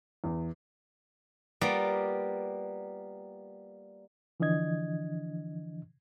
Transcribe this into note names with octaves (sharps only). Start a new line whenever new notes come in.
E2
G3 A#3 B3 F4 D5
D3 E3 F3 D4 D#5 G#6